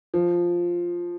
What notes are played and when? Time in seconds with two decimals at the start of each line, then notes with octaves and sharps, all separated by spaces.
0.14 F3